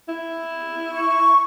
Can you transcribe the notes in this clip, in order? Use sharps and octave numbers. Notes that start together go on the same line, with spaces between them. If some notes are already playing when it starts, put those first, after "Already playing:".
E4
C#6